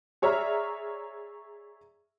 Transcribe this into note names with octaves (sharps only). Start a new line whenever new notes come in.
G#4 C#5 D5 E5 A#5 F6